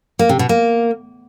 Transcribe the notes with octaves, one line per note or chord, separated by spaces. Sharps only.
A#3
C3
B2
A#3